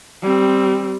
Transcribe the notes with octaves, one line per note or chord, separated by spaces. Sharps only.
G3 C4